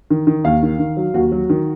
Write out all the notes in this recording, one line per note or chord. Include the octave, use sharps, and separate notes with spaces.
D#3
D#3
D#2 F5
D#3
D#3
F#3
D#2 F#4
F#3
D#3